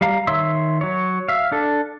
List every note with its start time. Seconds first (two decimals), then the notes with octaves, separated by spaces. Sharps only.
0.01 G3 F5 A#5
0.27 D#3 C#5 E5 C6 E6
0.81 F#3 C#5
1.28 E5 F5
1.52 D4 A4